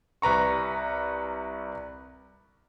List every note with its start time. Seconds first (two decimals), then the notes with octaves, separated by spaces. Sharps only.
0.22 C2 B4 A#5 C#6